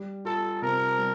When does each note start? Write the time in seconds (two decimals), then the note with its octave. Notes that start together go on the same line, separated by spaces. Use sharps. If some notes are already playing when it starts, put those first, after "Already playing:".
Already playing: G3
0.25 F4 A4
0.62 C3 A#4
0.98 G3